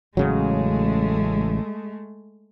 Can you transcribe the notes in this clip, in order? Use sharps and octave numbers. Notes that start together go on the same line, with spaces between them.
A1 C#3 F#3 G#3 A3